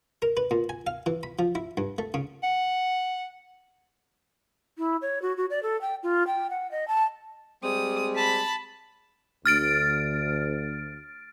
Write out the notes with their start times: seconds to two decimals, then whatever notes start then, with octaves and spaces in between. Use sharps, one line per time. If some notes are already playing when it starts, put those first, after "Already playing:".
0.22 A#4
0.37 B4
0.51 A#2
0.69 G#5
0.87 F5
1.06 E3
1.23 B5
1.39 F3
1.55 E4
1.77 G2
1.98 A3
2.14 C#3
2.43 F#5
4.78 E4
5.02 C#5
5.22 F#4
5.37 F#4
5.50 D5
5.63 A4
5.81 G5
6.03 F4
6.27 G5
6.50 F#5
6.71 D#5
6.88 A5
7.64 G3 G#3 C4 D#6
8.16 A5 B5 B6
9.46 D2 F6 A6 D7